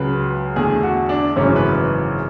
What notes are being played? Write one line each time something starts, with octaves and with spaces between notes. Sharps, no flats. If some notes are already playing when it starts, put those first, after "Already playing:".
Already playing: C#2 C#3 F#3 B4
E2 D3 A3 G#4
F#4
D4
G#1 F#2 C#3 E3 A3 C#4
B4